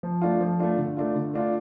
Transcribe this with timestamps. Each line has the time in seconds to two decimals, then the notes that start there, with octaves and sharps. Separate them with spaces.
0.03 F3
0.21 A3 D4 F4
0.40 F3
0.59 A3 D4 F4
0.78 D3
0.97 A3 D4 F4
1.15 D3
1.34 A3 D4 F4